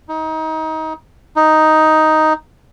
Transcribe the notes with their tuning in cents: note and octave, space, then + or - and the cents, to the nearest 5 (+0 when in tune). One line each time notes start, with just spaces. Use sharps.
D#4 +25
D#4 +5